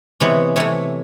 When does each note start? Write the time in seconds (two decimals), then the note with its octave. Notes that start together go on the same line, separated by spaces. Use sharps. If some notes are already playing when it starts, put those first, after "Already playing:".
0.20 C3 E3 G#3 B3 C#5
0.56 C3 E3 A3 C#5